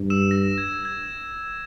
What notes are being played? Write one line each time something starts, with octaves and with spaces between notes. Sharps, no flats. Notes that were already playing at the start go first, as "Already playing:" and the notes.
Already playing: G2
E6 E7
A#6
G#6
G#6